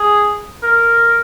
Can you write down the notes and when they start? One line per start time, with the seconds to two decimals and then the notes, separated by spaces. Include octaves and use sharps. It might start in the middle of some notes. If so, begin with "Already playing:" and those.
Already playing: G#4
0.63 A#4